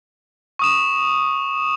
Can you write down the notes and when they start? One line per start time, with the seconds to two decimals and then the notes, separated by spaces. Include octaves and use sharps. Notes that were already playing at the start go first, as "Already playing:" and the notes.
0.59 C#6 D#6 E7